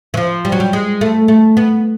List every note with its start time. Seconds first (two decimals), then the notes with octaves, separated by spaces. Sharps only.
0.14 E3
0.17 F3
0.45 G3
0.52 F#3
0.60 G3
0.73 G#3
1.01 A3
1.28 A3
1.57 B3